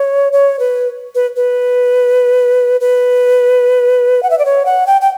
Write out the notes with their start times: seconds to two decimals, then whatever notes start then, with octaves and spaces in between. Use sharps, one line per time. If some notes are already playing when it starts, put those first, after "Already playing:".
Already playing: C#5
0.33 C#5
0.59 B4
1.15 B4
1.36 B4
2.80 B4
4.23 F#5
4.30 E5
4.39 D5
4.45 C#5
4.66 F#5
4.87 G5
5.01 G5